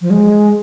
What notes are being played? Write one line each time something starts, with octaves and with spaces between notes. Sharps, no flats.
F3
G#3